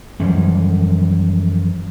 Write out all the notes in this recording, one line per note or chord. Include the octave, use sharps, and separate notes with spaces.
F#2 E3 F3 G3